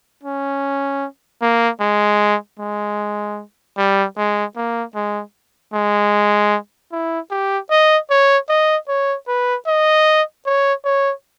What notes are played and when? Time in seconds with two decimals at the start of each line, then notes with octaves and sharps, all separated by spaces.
0.23 C#4
1.42 A#3
1.81 G#3
2.60 G#3
3.78 G3
4.17 G#3
4.56 A#3
4.95 G#3
5.74 G#3
6.92 E4
7.31 G4
7.70 D#5
8.10 C#5
8.49 D#5
8.88 C#5
9.28 B4
9.67 D#5
10.46 C#5
10.85 C#5